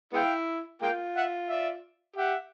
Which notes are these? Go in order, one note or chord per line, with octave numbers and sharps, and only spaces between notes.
G#3 B3 E4 F5 G5
G#3 A#3 F4 F5 G5
E5 F#5
D5 E5
G4 E5 F#5